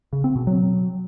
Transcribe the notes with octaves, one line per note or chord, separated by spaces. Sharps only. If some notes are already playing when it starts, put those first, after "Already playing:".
C#3
C4
B2
F#3